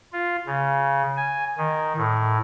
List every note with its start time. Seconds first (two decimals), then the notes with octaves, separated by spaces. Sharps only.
0.13 F4
0.47 C#3
1.17 G#5
1.58 D#3
1.97 A2